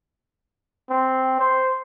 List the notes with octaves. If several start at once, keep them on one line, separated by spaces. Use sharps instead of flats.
C4
C5